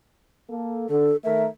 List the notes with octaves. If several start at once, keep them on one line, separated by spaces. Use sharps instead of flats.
A#3 A4
D3 A4
D#3 A3 A#4 E5